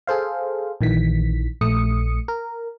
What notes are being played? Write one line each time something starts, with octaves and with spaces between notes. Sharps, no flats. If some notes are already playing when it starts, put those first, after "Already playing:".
G#4 A4 C5 F5
A#1 D#3 E3 B6
A#1 A3 D#6 C#7
A#4